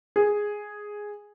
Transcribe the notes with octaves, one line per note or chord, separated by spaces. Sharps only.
G#4